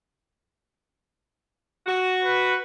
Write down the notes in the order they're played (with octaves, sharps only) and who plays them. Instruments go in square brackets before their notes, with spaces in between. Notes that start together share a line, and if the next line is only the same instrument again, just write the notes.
[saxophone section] F#4
[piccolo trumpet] B4